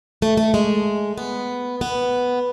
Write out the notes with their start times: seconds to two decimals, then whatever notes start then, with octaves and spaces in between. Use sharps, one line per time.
0.22 A3
0.37 A3
0.54 G#3
1.18 B3
1.81 B3